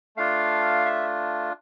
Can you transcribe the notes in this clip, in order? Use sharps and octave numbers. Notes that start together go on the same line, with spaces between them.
A3 D4 F4 F5
E5